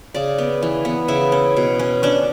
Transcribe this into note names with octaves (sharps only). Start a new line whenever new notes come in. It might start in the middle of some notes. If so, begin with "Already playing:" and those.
C#3 D5
B3
E3
B3
C#3 E4
C#4
B2
C#4
C#4 D4